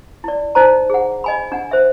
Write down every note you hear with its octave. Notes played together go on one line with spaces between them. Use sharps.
E4 D5
D#4 C5 A#5
G#4 F#5
D#5 G#5 B5
D4 F#5 G#5
C5 E5